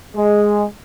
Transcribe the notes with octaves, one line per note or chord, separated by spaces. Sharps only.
G#3